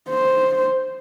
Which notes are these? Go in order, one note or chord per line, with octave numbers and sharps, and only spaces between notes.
C5